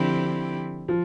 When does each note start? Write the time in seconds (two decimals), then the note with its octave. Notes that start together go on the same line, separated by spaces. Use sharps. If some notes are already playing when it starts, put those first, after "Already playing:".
Already playing: D3 F3 C4 E4 G4
0.88 F3